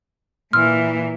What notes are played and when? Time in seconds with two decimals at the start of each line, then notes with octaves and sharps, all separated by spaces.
0.53 A#2 E3 C6 E6 F6